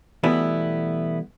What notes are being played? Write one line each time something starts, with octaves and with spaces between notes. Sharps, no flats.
B2 E3 G3 A3 B3 E4